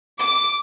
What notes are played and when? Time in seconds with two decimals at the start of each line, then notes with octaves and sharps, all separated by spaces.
0.19 D6